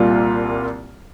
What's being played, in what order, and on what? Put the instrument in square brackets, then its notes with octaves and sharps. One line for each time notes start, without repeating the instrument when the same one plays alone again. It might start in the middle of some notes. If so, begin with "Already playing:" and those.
Already playing: [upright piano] C2 A#2 G3 A#3 F4